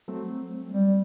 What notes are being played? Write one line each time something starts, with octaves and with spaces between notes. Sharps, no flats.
F#3 A3 C4
G3